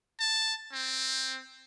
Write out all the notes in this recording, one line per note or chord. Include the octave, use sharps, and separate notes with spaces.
A5
C4